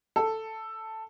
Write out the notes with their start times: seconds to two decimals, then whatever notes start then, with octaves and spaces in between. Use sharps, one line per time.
0.16 A4